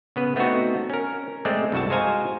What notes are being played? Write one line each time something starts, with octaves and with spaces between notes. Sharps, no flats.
C#3 B3 B4
A3 B3 C4 D4 D#4 F#4
C#4 A#4
G#3 A3 C4 D5
C2 G2 F#4 E5 A5
G#3 F#4 C5 F5 G#5 A#5